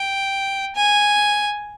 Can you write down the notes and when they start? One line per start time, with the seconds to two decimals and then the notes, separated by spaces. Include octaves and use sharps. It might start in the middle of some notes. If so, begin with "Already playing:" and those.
Already playing: G5
0.76 G#5